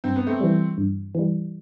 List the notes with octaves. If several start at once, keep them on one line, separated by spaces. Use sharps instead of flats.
G2 C4
B3
A3 C4
E3 G3
G2
E3 G3